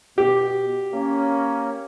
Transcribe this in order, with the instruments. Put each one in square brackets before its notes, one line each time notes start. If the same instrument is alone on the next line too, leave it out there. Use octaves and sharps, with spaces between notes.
[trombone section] B2 [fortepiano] G4
[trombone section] A#3 C#4